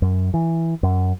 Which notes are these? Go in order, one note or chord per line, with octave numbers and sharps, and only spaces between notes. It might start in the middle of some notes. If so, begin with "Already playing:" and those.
F#2
E3
F#2